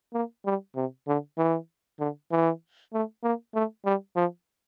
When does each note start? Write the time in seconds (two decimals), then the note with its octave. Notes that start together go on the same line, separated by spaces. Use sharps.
0.13 A#3
0.46 G3
0.75 C3
1.08 D3
1.38 E3
2.00 D3
2.31 E3
2.93 A3
3.23 A#3
3.55 A3
3.85 G3
4.16 F3